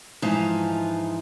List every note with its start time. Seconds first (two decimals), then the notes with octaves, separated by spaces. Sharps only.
0.22 G#2 E3 F3 D#4 F4 A#5